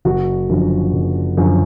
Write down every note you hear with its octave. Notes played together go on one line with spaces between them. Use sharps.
F#1 F#4
F#2 D3 F3
F#1
F#2 D3 F3